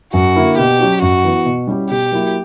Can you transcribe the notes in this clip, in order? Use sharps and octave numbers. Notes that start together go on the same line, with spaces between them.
F#2 F#4
D3 A#3 E4
B2 G4
F#3 C#4 F#4
F#2 F#4
E3 B3
B2
G3 C#4 E4 G4
B2 G4
F#3 A#3 E4